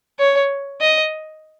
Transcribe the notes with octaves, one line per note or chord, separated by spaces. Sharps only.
C#5
D#5